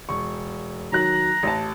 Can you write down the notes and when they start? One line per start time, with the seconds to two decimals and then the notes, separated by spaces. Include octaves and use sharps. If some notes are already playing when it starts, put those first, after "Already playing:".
0.09 E1 C#6
0.92 D#3 F#3 A#5 F#6
1.43 A1 A5